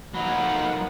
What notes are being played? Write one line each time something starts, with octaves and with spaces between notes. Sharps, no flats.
D#3 F3 F#3 A#3 D#4 F#5 B5